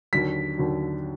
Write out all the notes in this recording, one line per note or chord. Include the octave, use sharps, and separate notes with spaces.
D#2 D3 F#3 B6
D#2 D3 F#3